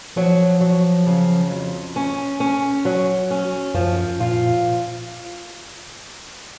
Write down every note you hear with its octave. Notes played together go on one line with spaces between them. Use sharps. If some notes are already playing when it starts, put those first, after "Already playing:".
F3 F#3
F#3
C#3
F2
C#4
C#4
F#3
C#4
F#2 F3
A#2 F4